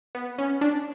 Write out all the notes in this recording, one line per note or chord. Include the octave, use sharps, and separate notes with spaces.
B3
C#4
D4